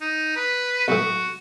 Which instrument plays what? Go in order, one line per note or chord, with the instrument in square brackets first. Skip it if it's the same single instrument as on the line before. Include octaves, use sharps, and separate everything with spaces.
[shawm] D#4
B4
[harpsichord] B1 A2 [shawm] F#4